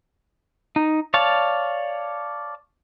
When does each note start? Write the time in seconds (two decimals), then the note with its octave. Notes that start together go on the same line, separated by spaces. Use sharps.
0.76 D#4
1.14 C#5 D5 F5 A5